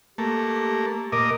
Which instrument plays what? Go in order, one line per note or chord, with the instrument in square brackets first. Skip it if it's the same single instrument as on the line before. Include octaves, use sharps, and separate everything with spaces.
[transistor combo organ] A3 A#3 [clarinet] G4
[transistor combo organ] A#2 A#4 D#5 [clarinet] D6